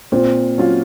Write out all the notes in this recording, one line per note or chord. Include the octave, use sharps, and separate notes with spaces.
A#2 C4
F#3 C#4 F4